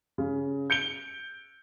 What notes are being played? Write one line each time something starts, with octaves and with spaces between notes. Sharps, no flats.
C#3
G6 C#7 D7 G7